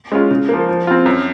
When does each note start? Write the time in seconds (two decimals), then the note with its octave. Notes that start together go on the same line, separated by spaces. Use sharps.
0.12 G#3 C#4 F4
0.31 C#3
0.49 F3 A#3
0.69 F3
0.87 C4 F4
1.06 F#2